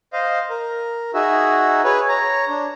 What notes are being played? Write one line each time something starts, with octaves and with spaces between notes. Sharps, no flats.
C5 D#5 F5
A#4
D#4 F#4 G#4 E5
G#4 B4 C#5
C#5 A#5
D4